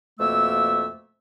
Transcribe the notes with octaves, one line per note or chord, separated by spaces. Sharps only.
F2 B2 A3 A#3 E5 E6